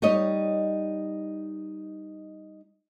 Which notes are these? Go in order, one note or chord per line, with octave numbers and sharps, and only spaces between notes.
G3 D#4 C#5 D#5